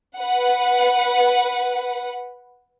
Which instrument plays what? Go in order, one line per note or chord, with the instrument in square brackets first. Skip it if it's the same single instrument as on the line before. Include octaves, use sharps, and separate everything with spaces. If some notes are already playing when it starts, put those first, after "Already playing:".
[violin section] B4 F#5